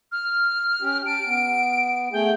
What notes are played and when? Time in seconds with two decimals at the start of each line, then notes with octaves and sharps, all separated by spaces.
0.12 F6
0.82 C#4 G4
1.06 G4 A5 D7
1.26 B3
2.13 A3 G#4 G5